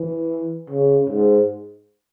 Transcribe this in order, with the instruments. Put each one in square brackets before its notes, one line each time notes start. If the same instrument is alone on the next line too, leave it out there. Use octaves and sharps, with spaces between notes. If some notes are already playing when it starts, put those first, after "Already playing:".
Already playing: [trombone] E3
C#3
G#2